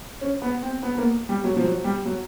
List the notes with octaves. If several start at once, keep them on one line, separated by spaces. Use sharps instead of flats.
C#4
B3
C4
B3
B3
A#3
G3
F#3
F3
F#3
G3
F#3